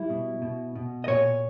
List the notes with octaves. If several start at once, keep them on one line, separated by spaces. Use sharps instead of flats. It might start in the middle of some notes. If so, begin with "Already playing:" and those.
Already playing: G3 E4
B2
B2
B2
D#5
A#2 C#5